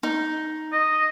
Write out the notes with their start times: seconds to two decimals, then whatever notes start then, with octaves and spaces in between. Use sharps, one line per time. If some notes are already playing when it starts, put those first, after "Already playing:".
0.03 D#4
0.72 D#5